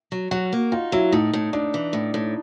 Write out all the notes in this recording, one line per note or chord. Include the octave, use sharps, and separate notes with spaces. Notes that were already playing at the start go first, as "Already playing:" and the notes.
F#3
F#3 F#4
A#3
D#4 F4
F#3 E4
A2 D#4
A2
A2 D4
E3
A2
A2